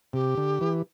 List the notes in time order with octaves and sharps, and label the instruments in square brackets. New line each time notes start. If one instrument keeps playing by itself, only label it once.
[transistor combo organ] C3 [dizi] G4
[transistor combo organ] D3
E3